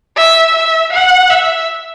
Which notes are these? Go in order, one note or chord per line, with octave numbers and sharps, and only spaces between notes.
E5
E5
F#5
E5